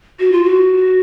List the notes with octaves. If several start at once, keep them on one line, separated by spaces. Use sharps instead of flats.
F#4
F4
F#4